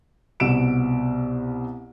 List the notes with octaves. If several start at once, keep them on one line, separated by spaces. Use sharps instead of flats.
C2 B2 E6 D7 E7